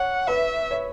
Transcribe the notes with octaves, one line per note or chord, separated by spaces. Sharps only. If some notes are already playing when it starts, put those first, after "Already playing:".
Already playing: C#5 F#5
B4 E5
C#5